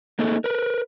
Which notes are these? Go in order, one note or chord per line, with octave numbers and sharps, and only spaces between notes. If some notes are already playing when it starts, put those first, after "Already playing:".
A3 A#3 D#4 G#4 A4
A#4 B4